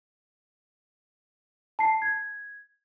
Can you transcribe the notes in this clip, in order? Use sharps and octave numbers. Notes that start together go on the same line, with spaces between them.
A5 C7
G#6